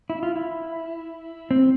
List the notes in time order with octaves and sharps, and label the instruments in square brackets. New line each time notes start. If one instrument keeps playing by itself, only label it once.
[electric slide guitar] E4
F4
E4
C4